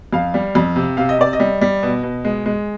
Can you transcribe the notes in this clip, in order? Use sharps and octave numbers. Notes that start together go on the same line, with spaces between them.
F2 F5
G3
F2
C3
C3 F5
D#5
C3 D5
D#5
G3
G3
B2
B2
G#3
G#3